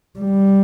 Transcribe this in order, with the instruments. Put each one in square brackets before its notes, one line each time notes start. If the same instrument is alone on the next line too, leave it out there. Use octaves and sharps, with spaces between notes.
[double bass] G3